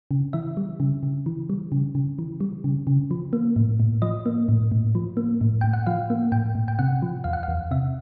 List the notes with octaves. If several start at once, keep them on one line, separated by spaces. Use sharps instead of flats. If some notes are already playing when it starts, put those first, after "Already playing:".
C#3
E3 E5
G3
C#3
C#3
E3
G3
C#3
C#3
E3
G3
C#3
C#3
F3
A#3
A2
A2
F3 D#5
A#3
A2
A2
F3
A#3
A2
A2 G5
F#5
F3 F5
A#3
A2 G5
A2
G5
C3 F#5
F3
E2 F5
F#5
F5
E2
C3 E5